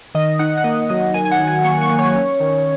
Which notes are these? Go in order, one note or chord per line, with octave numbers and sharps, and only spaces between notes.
D#3 D#5
D#4 F#5
F#5
A#3 D#5
F#3 D#5
D#3 G#5
G#5
F#5
D#3
G#5
A#3 C#6
C#6
A#3
C#5
C#4
D#3